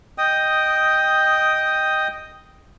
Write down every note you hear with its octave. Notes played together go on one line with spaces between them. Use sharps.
D#5 G5 D#6